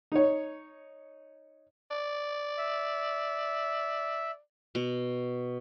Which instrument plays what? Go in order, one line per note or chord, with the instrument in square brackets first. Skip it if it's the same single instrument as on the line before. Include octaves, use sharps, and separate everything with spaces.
[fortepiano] D#4 C#5
[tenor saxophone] D5
[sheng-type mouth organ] E5
[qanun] B2